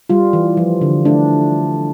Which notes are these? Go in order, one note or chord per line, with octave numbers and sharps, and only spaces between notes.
G3 F4
E3
F3
D3
A3 D4